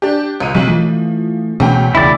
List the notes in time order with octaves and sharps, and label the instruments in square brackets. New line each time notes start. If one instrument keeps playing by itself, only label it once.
[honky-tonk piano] D4 G4
C#2 D#7
[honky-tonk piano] B1 F#7 [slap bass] F#3 G3 C4
[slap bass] E3 A3 [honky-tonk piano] F3
[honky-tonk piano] D2 C#4 G5 [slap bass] B2 E3 G#3
[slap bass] E1 C#2 C#3 [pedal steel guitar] E4 D5